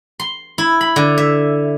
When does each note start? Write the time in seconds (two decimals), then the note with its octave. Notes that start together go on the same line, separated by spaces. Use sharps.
0.20 C6
0.58 E4
0.81 B5
0.96 D3
1.18 E5